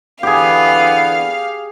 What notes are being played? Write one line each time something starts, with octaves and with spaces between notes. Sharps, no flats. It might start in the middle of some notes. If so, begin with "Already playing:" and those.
D3 E3 B3 G4 G#4 F5